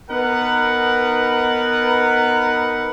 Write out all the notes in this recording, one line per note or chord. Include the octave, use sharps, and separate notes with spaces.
B3 D#4 A#4 B4 F#5